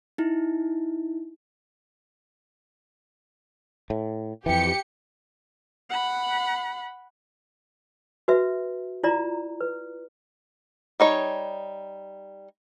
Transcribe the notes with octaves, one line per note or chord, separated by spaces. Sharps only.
D#4 E4
A2
F2 E3 G4 C#7
F#5 B5
F#4 B4 E5
E4 F4 D5 A#5
B4
G3 D#4 C#5